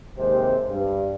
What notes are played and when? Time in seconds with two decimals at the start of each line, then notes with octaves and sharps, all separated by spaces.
0.17 D#2 C3 G#3 C4 C5
0.68 G2